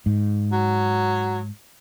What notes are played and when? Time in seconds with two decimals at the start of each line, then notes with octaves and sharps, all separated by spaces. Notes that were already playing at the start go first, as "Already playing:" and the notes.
0.06 G#2
0.52 F#3